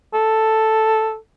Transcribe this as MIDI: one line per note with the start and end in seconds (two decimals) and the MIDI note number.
0.14 1.16 69